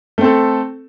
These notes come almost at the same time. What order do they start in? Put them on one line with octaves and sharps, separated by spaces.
A3 C4 A4